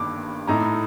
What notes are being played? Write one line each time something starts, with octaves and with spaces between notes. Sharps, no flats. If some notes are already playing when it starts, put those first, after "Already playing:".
Already playing: G1 G2 D#3 A#3 D6
A2 A3 D#4 A#5